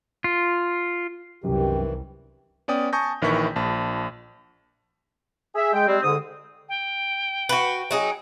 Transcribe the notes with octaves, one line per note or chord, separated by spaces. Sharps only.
F4
C2 F#2 D#3 E3 G4
B3 C#4 D5 G5 D#6
G#5 A5 C#6 D#6 G6 A#6
A#1 D#3 E3 E4 C#6 B6
A#1 A5
G#4 E5
G#3 G5
G3 G#3 C4
G#2 D3 D#6
G5
F#4 B4
F#3 D#4 G#4